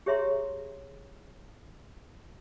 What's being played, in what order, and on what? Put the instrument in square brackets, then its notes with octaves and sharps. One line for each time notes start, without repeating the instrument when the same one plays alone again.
[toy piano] G4 G#4 C#5 E5 A#5 C6